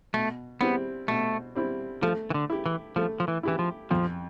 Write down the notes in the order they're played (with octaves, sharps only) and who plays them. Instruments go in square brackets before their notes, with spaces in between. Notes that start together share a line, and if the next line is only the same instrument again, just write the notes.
[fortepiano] B2 [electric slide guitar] A3
[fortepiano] G3 C4 E4 [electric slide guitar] B3
[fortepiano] B2 [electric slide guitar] A3
[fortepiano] G3 C4 E4
[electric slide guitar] F3 [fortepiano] A3
[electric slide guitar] E3
D3
[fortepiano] E4 G4
[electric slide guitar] E3
[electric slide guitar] F3 [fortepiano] A3
[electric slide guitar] F3
E3
[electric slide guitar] E3 [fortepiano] E4 G4
[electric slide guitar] F3
[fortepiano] F2 [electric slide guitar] F3